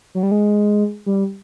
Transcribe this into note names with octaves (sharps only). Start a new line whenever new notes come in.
F#3
G3
G#3
G3